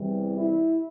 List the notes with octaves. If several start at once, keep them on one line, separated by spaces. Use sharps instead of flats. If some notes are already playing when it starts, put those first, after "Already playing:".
Already playing: E2 C3 E3 G3
E4